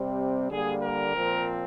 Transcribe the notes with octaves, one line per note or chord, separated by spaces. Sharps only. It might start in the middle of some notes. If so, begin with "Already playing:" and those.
Already playing: C3 G3 C4
D3 G3 A#3 G#4
A#4
A#2 F3 C4